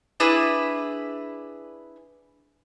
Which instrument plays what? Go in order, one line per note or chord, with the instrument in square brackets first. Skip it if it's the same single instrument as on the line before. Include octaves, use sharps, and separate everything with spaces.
[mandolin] D4 E4 G#4 B4